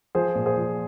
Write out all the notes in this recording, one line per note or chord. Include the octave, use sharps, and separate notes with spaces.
F3 G#4 C5
A#2
G#4 C5
F3